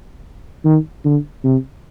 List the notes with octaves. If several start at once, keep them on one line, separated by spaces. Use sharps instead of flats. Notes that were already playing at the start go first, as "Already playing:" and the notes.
D#3
D3
C3